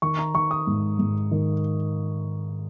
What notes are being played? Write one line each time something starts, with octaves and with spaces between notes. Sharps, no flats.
D#3 C#6
A#5
D#3 C#6
D#6
G#2
G#2
D#3